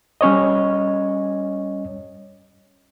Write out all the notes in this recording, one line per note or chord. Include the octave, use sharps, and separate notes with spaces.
G3 C#4 C#5 D#5